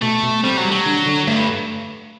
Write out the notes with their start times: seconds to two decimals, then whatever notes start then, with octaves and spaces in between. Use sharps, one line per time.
0.02 B2 A3
0.23 B2
0.43 G3 C4
0.57 F#3
0.65 G3
0.71 F#3
0.86 D3
1.06 D3
1.27 G2 A3